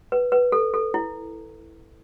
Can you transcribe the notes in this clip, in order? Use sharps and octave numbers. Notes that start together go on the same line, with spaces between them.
B4
B4
A4
A4
E4